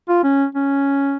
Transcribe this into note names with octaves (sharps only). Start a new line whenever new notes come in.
F4
C#4
C#4